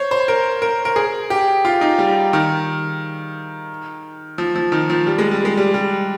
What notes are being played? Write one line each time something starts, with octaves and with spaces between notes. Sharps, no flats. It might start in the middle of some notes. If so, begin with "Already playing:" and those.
Already playing: C5 C#5
C5
A#4
A#4
A#4
G#4
G4
F4
D#4
G3
D#3
F3
F3
D#3
F3
G3
G#3
G3
G#3
G3
G3